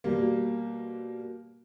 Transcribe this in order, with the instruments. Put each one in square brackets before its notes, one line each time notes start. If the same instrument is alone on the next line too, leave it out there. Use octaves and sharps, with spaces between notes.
[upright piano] B2 G3 A#3